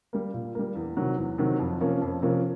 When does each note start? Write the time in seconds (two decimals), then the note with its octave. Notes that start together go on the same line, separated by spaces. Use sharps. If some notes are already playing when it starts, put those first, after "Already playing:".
0.13 G3 A#3
0.34 A#2
0.55 G3 A#3
0.75 E2
0.97 C3 D#3 F#3
1.17 E2
1.38 C3 D#3 F#3
1.59 F2
1.80 C3 F3 A#3 C#4
2.01 F2
2.22 C3 F3 A#3 C#4